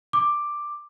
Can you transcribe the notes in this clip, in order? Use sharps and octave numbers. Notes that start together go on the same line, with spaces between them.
D6